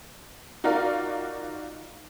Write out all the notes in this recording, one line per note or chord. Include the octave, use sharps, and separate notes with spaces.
D#4 F4 F#4 A#4 D5 F5